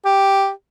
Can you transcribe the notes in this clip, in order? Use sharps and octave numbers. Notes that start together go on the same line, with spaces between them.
G4